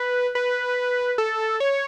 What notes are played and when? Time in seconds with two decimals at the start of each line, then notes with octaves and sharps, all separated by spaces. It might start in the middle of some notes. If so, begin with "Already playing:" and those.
Already playing: B4
0.35 B4
1.18 A4
1.60 C#5